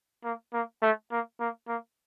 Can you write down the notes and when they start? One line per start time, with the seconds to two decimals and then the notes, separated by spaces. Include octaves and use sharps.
0.24 A#3
0.53 A#3
0.82 A3
1.11 A#3
1.40 A#3
1.68 A#3